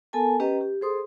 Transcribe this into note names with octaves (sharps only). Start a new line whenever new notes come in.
B3 A4 A#4 G#5 A5
C#4 G4 B4 D#5 G5 A#5
G4
G#4 A4 C5 C6 D#6